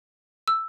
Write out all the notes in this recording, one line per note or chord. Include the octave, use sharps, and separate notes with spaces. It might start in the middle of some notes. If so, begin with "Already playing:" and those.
E6